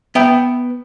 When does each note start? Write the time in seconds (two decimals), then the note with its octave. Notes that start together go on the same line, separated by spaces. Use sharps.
0.15 B3 E5 G5